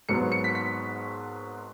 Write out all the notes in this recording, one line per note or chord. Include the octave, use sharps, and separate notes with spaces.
G#1 G#2 F#3 B3 C#7
C#7
B6
B6